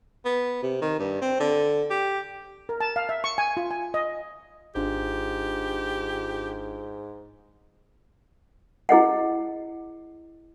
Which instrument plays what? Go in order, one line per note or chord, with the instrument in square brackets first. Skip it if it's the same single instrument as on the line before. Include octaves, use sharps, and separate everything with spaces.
[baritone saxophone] B3
C3
D#3
G2
C4
D3
G4
[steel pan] A#4
A5
F5
E5
C#6
G#5
F4
G#5
D#5
[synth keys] G#1 D4 F4 [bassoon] G#2 [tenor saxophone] G4
[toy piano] E4 G#4 D#5 F#5